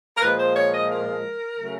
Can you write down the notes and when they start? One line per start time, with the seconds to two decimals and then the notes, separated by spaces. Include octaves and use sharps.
0.16 A#4
0.21 A#2 F3 G#3 B4
0.39 C5
0.56 C#5
0.73 D#5
0.89 A#4
1.58 C#3 F#3 A3